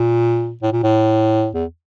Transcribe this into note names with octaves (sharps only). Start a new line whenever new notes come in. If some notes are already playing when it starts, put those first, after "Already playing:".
Already playing: A#2
A2
A#2
A2
E2